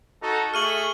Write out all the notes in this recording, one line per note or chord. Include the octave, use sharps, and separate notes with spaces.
D#4 F#4 A4
A3 G#4 C#6 F6 D#7 F#7